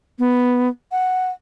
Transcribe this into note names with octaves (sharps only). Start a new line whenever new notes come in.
B3
F#5